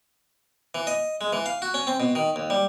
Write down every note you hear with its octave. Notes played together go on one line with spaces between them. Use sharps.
E3
D#5
G#3
E3
F5
F#4
C#4
C4
B2
D#3
D#2
G3